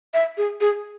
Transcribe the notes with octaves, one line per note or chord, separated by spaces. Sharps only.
E5
G#4
G#4